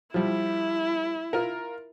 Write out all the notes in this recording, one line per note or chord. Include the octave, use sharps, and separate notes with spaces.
F3 G3 E4
F4 A#4